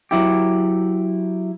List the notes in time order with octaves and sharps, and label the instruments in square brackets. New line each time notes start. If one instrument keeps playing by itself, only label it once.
[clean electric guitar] F#3 E4 G4